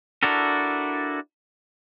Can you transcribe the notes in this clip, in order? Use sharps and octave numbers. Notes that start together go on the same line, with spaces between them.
D4 E4 F#4 A4 A#4